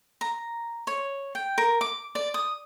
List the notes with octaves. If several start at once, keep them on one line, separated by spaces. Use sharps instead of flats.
A#5
C#5
G5
A#4
D6
D5
D#6